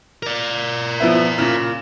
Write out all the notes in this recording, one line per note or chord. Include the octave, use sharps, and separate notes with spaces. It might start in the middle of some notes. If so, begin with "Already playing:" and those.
A#4 D5
F3 B3 E4
A#2 C#3